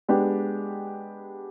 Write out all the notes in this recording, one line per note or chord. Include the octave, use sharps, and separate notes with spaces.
G#3 B3 D4 G4